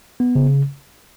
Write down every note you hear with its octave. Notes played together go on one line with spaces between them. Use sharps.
B3
C#3